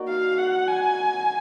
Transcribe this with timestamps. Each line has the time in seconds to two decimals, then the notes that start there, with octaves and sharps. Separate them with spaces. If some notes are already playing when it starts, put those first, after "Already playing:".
Already playing: A#3 D#4 F#4 D5
0.08 F5
0.38 F#5
0.68 G#5